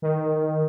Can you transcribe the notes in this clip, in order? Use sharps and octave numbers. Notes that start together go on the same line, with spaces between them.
D#3